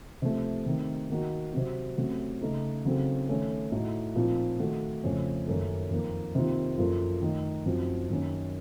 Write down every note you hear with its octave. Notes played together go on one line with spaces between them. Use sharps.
C3 F3 A3
C3 D#3 A3
D#3 A#3 D#4 F#4
C3 F#3 C4 F#4
C3 F#3 A3 C#4 F#4
C#3 A3 D#4 A4
C#3 F#3 C4 D#4 A4
D#3 A3 C#4 A4
A2 A3 D#4 F#4
A#2 F3 C4 D#4
D#3 A3 D#4 F#4 A4
F2 C#3 A3 C#4
F#2 D#3 A#3 C#4 A4
F2 D#3 A#3
C3 D#3 A#3 F4
F#2 F3 A#3 F4 A4
D#3 A3 D#4
F#2 F3 C4 D#4 F#4
F#2 D#3 A#3 C#4